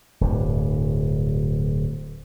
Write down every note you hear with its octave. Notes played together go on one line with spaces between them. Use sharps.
D1 G2